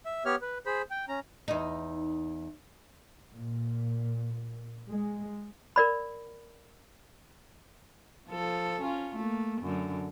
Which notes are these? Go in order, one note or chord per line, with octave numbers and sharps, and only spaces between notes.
E5
B3 G4 C#5 F6
B4
G#4 C5 B5
G5
C#4 A#5
E2 D#4
A#2
G#3
A#4 D5 B5
F3 A4
C#4 F4
A3 A#3
F#2 D3